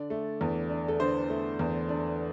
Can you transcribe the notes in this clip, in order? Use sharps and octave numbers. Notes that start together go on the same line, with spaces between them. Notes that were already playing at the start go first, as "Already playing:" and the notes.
Already playing: D3 D5
A3
E2
D4
A4
D3 C5
A3
E2
D4